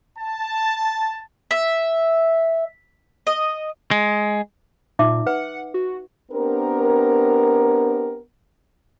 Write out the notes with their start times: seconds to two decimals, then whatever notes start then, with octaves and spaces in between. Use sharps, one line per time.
0.19 A5
1.51 E5
3.27 D#5
3.91 G#3
4.99 A#2 D#4 E5 D6
5.27 B4 F#5
5.74 F#4
6.32 B3 C4 D4 G4 A#4